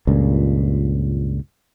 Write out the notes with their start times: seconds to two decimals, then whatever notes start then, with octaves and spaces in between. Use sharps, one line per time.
0.07 C#2 G2 A#2